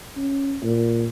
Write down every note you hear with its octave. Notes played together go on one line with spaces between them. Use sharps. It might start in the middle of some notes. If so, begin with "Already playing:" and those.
C#4
A#2